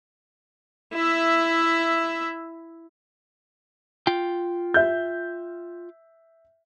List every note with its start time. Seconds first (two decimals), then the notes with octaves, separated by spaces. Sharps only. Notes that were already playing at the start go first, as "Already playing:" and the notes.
0.94 E4 E5
4.07 F4 G5
4.74 E5 G6